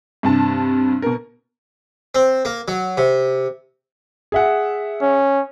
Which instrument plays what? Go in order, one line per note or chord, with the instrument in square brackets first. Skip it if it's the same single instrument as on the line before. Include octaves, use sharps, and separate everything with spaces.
[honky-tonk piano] G2 C3 A5
B2 A#4
[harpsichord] C4
A#3
F#3
C3
[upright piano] G#4 E5 F#5
[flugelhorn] C#4